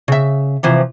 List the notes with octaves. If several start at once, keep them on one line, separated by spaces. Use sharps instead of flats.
C#3 E5
C3 E3 F3